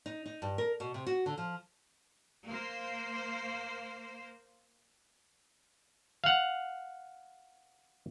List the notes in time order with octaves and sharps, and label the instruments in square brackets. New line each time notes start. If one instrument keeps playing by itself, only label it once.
[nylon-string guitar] D#4
D#4
G2
A#4
B2
C3
F#4
D3
F3
[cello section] A#3 C5
[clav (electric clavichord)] F5 F#5